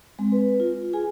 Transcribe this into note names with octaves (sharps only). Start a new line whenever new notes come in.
G#3 C4
B4
F4
F4 G#4 G#5